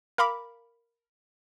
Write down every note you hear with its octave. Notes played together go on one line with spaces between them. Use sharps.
A#4 F5 A#5 B5 D6